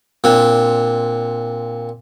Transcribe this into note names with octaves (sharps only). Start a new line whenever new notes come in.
A#2 C4 D4